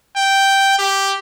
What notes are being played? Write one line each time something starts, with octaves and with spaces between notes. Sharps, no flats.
G5
G4